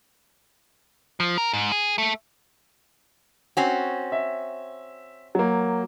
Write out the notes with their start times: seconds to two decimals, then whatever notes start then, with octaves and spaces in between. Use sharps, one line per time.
1.20 F3
1.38 A#4
1.53 G#2
1.72 G#4
1.98 A3
3.57 C4 C#4 F#4
4.12 E5
5.35 F#3 A#3